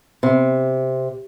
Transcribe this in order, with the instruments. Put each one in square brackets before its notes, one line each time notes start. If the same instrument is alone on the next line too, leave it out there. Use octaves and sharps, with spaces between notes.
[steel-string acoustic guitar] C3